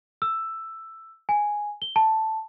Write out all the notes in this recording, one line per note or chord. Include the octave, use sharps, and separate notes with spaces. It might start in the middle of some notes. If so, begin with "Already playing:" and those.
E6
G#5
G7
A5